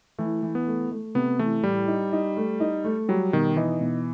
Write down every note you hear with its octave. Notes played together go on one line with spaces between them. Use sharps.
E3 A3
E3
B3
A3
A3
C3 B3
E3 A3
A2 G3
D#4
D#4
A3
D#4
A3
F#3 G3
B2 D#3
E3 D#4
B2